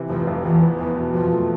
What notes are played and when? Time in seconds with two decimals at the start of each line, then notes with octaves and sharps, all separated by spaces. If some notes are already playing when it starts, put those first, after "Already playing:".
Already playing: C3 E3
0.09 F1 F3
0.27 F2
0.45 E2 E3
0.62 B3
0.80 E2 E3
0.97 B2
1.15 F2 F3
1.32 A3